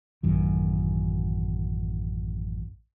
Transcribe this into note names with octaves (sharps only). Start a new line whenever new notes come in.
A1 F#2 D#3